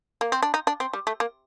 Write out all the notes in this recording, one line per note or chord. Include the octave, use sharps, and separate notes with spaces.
A#3
C4
D4
D#4
D4
C4
G3
A3
A#3